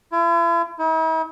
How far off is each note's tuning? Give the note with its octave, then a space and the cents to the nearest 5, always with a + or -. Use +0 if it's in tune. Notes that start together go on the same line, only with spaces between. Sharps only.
E4 +45
E4 -45